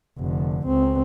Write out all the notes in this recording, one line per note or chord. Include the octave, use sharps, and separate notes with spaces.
F1 D3
C#2 C4